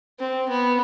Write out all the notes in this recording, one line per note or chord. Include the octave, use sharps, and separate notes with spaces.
C4
B3